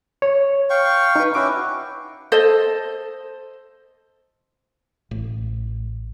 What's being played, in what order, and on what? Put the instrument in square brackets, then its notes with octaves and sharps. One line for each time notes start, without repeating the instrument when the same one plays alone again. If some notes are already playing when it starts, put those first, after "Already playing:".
[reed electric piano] C#5
[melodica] F5 G5 C#6
[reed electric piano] D#4 B4
[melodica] C#4 E4 F#4 [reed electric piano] D6
[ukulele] A4 C5 D#5
[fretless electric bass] A1